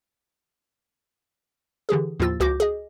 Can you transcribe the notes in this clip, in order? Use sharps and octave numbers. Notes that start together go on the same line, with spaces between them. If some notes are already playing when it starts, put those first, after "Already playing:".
D3 E3 G4 G#4
D#2 A2 F3 F4 E6 A6
C#2 F#4 D6 G6 A#6
G#4 D#5